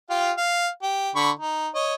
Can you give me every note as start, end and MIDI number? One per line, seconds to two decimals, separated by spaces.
0.10 0.32 65
0.10 0.32 67
0.10 0.32 77
0.37 0.68 77
0.82 1.11 67
1.16 1.30 50
1.16 1.30 83
1.16 1.30 85
1.39 1.68 63
1.75 1.95 73
1.75 1.95 75